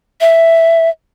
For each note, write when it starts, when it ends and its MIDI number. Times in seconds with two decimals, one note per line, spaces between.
0.21 0.90 76